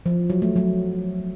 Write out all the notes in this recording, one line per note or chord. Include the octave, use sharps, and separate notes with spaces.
F3
F#3
A3
F#3